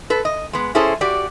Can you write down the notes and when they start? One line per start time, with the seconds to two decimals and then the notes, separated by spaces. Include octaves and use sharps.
0.10 A4 B4
0.25 D#5
0.53 G#3 B3
0.75 C#4 E4 G#4 A4 C5
1.01 F#4 G4 D5